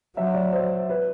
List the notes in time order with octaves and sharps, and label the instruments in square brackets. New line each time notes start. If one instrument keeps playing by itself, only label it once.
[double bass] F#3 [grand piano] E5
[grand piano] D5
C5
B4